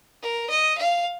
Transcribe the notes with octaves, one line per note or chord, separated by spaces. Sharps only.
A#4
D#5
F5